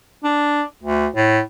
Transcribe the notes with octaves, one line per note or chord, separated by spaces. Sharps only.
D4
D2
A2